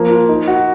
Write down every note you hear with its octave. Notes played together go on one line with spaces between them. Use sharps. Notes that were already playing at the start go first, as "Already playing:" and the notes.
Already playing: F3 A#3
F4
D#4
F#4